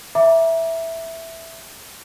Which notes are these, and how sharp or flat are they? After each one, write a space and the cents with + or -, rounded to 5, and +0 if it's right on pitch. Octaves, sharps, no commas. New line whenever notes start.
E5 +0 A#5 +25 D6 +0